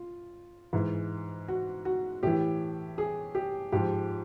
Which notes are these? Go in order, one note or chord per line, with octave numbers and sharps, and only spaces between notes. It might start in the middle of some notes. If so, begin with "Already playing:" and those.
Already playing: F4
G#2 E3
F#4
F#4
A2 E3 G4
G#4
G4
G#2 F3 G4